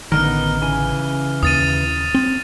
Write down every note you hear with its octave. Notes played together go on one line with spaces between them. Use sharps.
A1 D3 D#3 B3 D#4 A#4 F6
C#3 E3 G#5
D#2 D#6 A6 D#7
C4